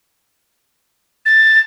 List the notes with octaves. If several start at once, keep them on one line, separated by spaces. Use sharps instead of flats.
A6